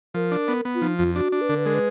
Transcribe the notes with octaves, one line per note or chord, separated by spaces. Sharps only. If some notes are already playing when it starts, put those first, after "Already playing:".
F3 A#4
D4
B3
B3
F4
F3 D#4
F2 F4
D4 F#4
D4
B4
D3 A#4
B4
G#3 A#4
B4